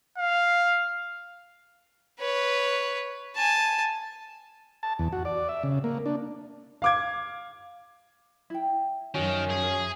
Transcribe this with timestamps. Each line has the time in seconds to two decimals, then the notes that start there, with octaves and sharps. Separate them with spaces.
0.18 F5
2.19 B4 C#5
3.35 G#5 A5
4.83 A5
4.99 E2
5.13 F#4
5.25 D5
5.49 E5
5.63 C#3
5.84 A#3
6.06 D4
6.82 F5 D6 G#6
8.50 E4 G5
9.15 F#2 D#3 F3 C#4 F#4
9.50 G#4